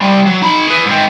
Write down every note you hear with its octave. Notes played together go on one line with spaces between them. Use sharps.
G3 C4
F#3
D#4 B5
G#4 B4
G#2 C4